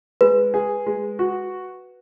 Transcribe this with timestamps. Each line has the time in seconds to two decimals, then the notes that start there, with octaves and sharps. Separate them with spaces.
0.21 G#3 B4
0.54 G#4
0.86 G#3
1.19 F#4